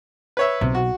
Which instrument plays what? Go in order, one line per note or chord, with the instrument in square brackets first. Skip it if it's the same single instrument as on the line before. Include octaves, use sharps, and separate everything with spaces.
[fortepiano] B4 C#5 E5
[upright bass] B1 [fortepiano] C3
[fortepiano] F#4